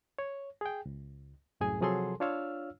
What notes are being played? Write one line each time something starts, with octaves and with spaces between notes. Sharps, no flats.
C#5
G#4 G5
C#2
C2 F#2 A2 G#4 G#5
C3 F3 F#3 G#4 A4 C6
D4 F4 C#5 F5 E6 F6